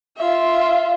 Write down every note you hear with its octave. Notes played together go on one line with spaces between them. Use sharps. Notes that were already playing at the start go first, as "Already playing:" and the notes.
F4 E5